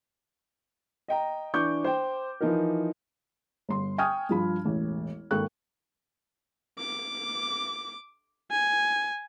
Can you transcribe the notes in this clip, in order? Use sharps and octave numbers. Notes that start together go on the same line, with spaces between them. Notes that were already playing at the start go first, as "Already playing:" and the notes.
D#5 G5 A#5
E3 D4 C#6 D6 G6
C5 G5
E3 F3 D#4 A#4
G1 C6
G5 G#5 C#6 D#6 F6 G#6
G2 F3 B5
E1 A1
G#1 A#3 A4 G5 C#6 F#6
D6
G#5